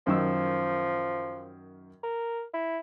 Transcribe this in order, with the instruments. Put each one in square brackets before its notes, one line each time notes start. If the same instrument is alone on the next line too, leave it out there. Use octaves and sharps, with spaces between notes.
[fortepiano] F#2 D#3 E6 [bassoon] F3
[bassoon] A#4
E4